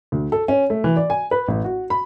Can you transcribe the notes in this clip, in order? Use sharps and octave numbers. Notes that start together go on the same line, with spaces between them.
D2
A4
C#4
A3
E3
D5
G#5
B4
A1
F#4
B5